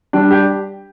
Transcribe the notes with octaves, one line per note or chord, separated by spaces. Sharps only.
G3 D4
G4